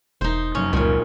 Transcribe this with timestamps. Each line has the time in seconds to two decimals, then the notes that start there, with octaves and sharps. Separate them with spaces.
0.21 E1 D#4 C5
0.55 F1 F#2 C#4
0.73 C#2 A#2 C#4